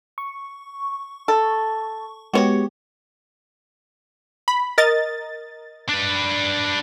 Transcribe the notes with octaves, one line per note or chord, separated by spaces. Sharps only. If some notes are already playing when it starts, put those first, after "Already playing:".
C#6
A4
G#3 B3 F#4 G4 C#5
B5
A#4 D#5 A6
D4 B4